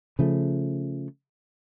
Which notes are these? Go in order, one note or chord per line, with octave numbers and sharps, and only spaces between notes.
C#3 F3 A3